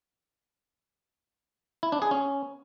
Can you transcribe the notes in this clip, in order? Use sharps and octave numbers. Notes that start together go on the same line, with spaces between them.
E4
D4
G#4
C#4